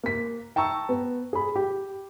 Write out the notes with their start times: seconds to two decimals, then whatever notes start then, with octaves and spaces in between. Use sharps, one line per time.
0.03 A#3 B6
0.56 G5 A5 A#5 C#6 E6
0.89 B3
1.33 G#4 B5
1.56 G4